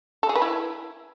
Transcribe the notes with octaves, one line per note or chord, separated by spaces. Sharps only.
A4
G#4
B4
E4